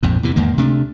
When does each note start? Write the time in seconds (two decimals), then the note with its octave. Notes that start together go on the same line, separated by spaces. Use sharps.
0.03 A#1 F2 G#2
0.23 E2 C3 E3
0.36 E2 G#2 D#3 A#3
0.57 D2 C3 A3 D4